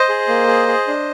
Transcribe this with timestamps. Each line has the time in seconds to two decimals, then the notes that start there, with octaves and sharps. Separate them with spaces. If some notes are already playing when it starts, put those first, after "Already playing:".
Already playing: C5 D#5
0.09 G#4
0.28 A#3
0.48 G#4
0.68 G#4
0.88 D4